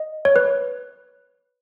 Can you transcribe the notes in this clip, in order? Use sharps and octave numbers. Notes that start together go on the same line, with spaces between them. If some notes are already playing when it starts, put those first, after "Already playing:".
Already playing: D#5
C#5
B4